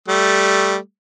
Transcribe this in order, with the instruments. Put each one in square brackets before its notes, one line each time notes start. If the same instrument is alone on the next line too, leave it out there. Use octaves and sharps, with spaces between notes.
[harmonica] G3 A3